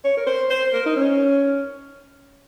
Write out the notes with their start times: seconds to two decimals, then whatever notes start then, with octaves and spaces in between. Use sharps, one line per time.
0.05 C#5
0.17 A#4
0.27 C5
0.50 C5
0.73 A#4
0.86 D#4
0.96 C#4